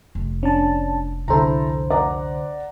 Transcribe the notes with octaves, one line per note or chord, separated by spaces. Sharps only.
F1
C#4 D4 A5
C2 F2 D3 E4 A4 C5 A#5
D5 F#5 A#5